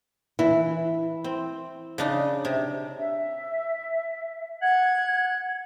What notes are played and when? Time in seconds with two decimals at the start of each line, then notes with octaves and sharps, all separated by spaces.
0.39 E3 E4
1.24 C4
1.98 C#3 D4 D#4
2.45 C3
2.98 E5
4.62 F#5 G#6